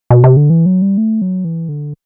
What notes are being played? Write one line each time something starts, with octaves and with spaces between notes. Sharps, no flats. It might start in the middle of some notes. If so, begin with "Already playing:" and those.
B2
C3
D3
E3
F#3
G3
A3
F#3
E3
D3